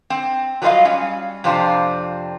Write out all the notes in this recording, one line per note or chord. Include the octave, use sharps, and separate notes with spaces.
C4
F#3 G3 A3 F4 D#5 F5
G3 C#4
F2 C3 C4 D4 F4